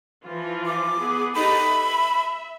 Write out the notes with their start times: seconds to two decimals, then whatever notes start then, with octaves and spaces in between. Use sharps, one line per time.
0.24 E3 F3 F4
0.66 D6
0.97 B3 G#4
1.35 D#4 G4 A4 B5
1.66 E5